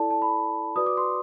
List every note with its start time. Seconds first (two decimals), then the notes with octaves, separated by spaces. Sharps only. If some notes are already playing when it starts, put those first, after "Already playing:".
Already playing: E4 A4 D5 A5
0.10 A5
0.22 B5
0.76 F#4 B4 D5 D#6
0.86 D6
0.97 C6